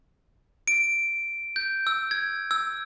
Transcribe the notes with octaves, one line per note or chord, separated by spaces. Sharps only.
D7
G6
E6
G#6
E6